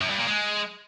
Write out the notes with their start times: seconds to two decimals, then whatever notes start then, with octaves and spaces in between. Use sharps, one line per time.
0.01 F#2
0.10 G2
0.19 A#2
0.27 G#3